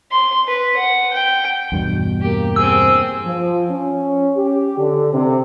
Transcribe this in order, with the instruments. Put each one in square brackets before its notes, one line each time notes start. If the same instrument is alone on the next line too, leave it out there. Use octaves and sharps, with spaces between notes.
[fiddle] C6
B4
F#5
G5
[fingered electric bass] E2 G2 B2
[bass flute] A#3 [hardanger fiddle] G4
[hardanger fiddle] C4 G#4 [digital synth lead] E6
[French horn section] F3
C#4
G4
D3
C3